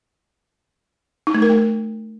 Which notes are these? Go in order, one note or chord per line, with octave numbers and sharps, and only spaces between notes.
D#4
A3
A#4
A3